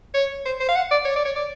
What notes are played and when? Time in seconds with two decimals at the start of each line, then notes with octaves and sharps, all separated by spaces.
0.14 C#5
0.46 C5
0.60 C5
0.69 F5
0.76 F#5
0.91 D5
1.05 C#5
1.16 D5
1.25 C#5
1.36 D5